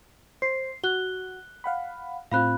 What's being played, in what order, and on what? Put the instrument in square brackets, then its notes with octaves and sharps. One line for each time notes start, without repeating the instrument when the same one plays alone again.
[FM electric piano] C5 [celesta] C7
[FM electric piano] F#4 [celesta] F#6 G7
[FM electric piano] F5 F#5 B5
[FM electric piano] A2 C4 F4 [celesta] F5 B5 F#6